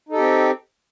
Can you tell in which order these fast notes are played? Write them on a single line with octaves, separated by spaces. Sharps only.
D#4 A4 G4 C4